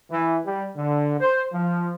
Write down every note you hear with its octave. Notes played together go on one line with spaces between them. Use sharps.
E3
G3
D3
C5
F3